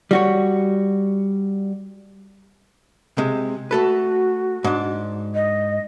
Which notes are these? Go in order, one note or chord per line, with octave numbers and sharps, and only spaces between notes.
G3 F#4 C#5
C3 G#3
A3 F#4 A4 B4
G#2 D4
D#5